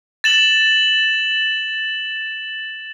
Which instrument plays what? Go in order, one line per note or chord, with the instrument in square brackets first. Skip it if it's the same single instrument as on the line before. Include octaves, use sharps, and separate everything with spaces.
[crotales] A6 E7 F#7